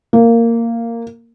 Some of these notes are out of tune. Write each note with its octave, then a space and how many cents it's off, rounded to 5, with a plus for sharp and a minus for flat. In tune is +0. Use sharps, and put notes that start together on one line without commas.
A#3 -10